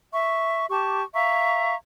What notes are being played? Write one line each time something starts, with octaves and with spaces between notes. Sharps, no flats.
E5 C#6
G4 A5 C#6 D6
E5 F5 A#5 C#6